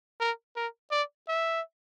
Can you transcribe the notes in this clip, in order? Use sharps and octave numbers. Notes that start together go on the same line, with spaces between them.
A#4
A#4
D5
E5